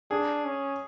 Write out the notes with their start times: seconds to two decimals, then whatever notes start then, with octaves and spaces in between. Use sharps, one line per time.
0.11 D4 G#4
0.45 C#4